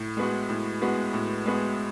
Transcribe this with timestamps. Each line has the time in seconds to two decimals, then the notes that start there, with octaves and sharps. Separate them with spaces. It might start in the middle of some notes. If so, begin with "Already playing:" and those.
Already playing: A2
0.17 G#3 B3 F#4
0.49 A2
0.81 G#3 B3 F#4
1.13 A2
1.46 G#3 B3 F#4